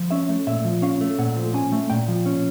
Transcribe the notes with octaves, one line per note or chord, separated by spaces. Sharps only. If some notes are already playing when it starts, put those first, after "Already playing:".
Already playing: F3
C#4 E5
A3
A#2 E5
F3
C#4 F5
A3
A#2 F#5
F3
C#4 G#5
A3
A#2 G5
F3
C#4